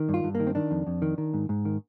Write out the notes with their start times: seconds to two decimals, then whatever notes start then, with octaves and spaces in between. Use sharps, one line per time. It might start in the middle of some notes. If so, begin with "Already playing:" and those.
Already playing: D#3
0.09 G2
0.14 F4
0.24 G2
0.35 A#3
0.40 D#3
0.47 C4
0.55 D#3 D4
0.71 F2
0.87 F2
1.02 D#3
1.18 D#3
1.34 G#2
1.49 G#2
1.65 D#3